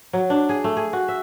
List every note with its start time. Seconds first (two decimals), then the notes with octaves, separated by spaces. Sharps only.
0.13 F#3
0.30 D4
0.49 G#4
0.64 A3
0.77 G#4
0.93 F#4
1.08 E5